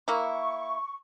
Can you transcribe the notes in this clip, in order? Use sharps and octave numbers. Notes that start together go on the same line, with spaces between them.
A#3 E4 C#6